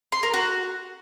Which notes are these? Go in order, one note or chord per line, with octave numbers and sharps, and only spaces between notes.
C6
A#4
F#4